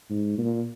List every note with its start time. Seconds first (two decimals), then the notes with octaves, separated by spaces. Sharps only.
0.10 G#2
0.38 A#2